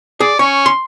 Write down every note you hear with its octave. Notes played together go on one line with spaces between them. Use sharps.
G#4 D5
C#4 C#5
C6